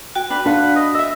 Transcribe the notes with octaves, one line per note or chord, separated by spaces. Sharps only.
F#4 G5
D4 B4 B5
D4 F4 B4 F5 F#5
D#5
D#5 E5 E6